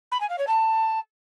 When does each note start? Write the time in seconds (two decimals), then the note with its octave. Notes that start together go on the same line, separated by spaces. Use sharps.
0.12 B5
0.20 G#5
0.29 F5
0.38 C#5
0.47 A5